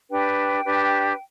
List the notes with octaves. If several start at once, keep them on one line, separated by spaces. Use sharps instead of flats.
D4 G4 B4 G5
D4 G4 B4